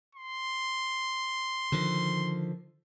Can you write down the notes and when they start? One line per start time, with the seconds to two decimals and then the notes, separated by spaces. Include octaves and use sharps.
0.15 C6
1.72 D3 D#3 F3